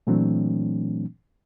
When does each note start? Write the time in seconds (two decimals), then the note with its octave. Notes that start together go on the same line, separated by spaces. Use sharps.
0.07 A#2 E3 F#3 A3 C4 D4